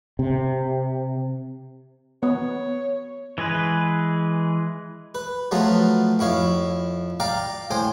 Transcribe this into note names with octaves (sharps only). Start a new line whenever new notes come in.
C3
B3 C#5
E3 G#3 G#4 B4
B4
F3 F#3 A3 B3 F4
F2 E4 C#5 F5
D5 F5 G5 A#5
A2 C5 G5 G#5